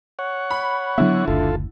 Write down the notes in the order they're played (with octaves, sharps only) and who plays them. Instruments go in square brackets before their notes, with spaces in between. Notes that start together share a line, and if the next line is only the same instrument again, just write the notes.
[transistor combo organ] C#5 F#5
[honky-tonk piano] B5
[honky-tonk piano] D3 E4 [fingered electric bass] F#3 B3
[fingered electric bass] F#1 D2 [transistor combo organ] F4 A4